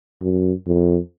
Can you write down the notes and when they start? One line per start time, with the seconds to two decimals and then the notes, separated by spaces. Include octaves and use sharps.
0.21 F#2
0.67 F2